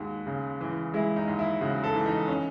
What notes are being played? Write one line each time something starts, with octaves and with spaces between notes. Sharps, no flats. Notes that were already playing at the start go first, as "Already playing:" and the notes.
Already playing: D#2 G#3 F#4
C#3
E3
G#3 E4
D#4
D#2
E4
C#3 F#4
A4
E3
D#4
C#4